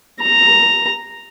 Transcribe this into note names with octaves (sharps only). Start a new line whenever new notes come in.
A#5